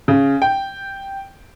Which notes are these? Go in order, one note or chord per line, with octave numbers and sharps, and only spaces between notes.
C#3
G5